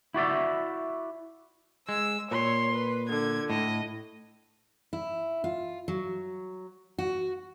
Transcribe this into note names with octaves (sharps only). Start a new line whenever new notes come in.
E4 F#4 D5 E5
G#3 E6
A#2 C#5 C6
B4
D3 G#6
A2 D#5
E4
F4
F#3
F#4